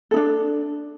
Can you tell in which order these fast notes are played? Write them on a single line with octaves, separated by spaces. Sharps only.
A4 D#4 D4